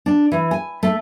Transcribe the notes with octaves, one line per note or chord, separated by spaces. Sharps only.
D4
E3
G#5
A3